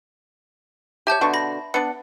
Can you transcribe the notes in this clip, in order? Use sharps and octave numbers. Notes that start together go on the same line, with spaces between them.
G4 C#5 E5 A5 G6
B2 D3 C#6
B5 A#6
B3 D4 C#7